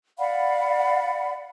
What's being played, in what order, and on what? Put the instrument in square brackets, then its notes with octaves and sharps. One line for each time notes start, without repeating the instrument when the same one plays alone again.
[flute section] D5 F5 F#5 B5